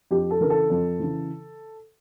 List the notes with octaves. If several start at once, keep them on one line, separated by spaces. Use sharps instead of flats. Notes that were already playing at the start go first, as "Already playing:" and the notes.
F2 G4
A4
C#3 E3 A#4
A4
F2
C#3 E3